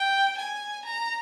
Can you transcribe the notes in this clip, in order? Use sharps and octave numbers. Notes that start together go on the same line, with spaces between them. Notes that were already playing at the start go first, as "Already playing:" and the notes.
Already playing: G5
G#5
A#5